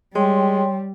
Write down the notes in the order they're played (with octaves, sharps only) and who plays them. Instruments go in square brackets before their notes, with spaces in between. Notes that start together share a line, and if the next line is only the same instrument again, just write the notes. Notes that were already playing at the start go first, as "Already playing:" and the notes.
[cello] G3 [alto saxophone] G#3 [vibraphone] C#5 G5 C6